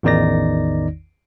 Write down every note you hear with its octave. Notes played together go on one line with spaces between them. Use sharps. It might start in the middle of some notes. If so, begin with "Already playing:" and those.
A1 E2 D#3 D#4 D5 A#6